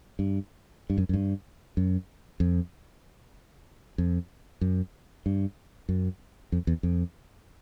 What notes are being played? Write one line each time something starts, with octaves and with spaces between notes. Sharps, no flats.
G2
G2
F#2
F#2
G2
F#2
F2
F2
F#2
G2
F#2
F2
E2
F2